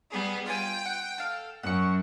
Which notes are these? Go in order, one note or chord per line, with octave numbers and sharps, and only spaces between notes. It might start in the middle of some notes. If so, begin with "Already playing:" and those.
G3 B3 G#4
F4 G5 G#5
F#5
A4 F5
F#2 F#5 C#6